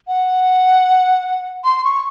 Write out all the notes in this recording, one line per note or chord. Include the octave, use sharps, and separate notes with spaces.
F#5
C6
C#6